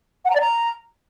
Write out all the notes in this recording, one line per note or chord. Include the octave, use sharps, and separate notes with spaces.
F#5
A#5
D5
A#5